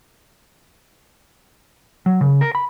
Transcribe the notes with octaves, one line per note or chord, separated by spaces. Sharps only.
F#3
C#3
A#4
B5